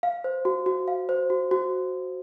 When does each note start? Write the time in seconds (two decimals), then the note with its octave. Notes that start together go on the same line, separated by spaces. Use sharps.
0.03 F5
0.24 C5
0.45 F#4
0.66 F#4
0.88 F5
1.09 C5
1.30 F#4
1.51 F#4